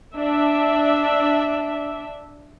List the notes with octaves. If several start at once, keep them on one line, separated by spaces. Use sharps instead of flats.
D4 E5